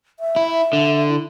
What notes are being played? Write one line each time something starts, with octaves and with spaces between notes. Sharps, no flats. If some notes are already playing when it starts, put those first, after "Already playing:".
E5
E4
D3
E4